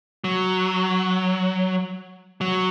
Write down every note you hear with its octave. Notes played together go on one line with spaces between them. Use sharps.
F#3
F#3